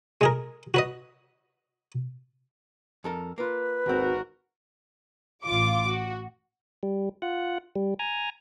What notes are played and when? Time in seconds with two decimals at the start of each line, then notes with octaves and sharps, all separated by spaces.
0.21 G#3 G#4 A#4
0.74 F#4 B4 D#5
3.04 F2 A4 A#4
3.38 A#3 F4 B4
3.86 G#1 D#2 C4 F#4 A#4
5.45 A1 F4 D6
5.90 F#4
6.83 G3
7.22 F4 F#5
7.76 G3
7.99 G#5 A#5